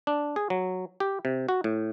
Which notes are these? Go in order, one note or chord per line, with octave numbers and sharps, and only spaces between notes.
D4
G#4
F#3
G4
C3
F#4
A2